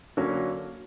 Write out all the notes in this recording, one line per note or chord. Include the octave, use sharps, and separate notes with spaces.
D3 F#3 A#3 C#4 F#4